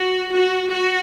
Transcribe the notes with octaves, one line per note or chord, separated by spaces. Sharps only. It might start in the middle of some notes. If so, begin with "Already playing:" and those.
Already playing: F#4
F#4
F#4